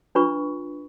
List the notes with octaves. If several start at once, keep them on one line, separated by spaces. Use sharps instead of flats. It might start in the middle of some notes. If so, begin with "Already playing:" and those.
D4 F4 B4 B5 C#6